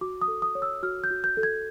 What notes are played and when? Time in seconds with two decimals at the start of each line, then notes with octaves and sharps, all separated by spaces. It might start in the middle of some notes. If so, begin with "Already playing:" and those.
0.01 F#4 D6
0.22 D#6
0.28 A4
0.42 D#6
0.55 C#5
0.62 E6
0.83 F#4 F6
1.04 G6
1.11 F#4
1.24 G6
1.37 A4
1.43 G#6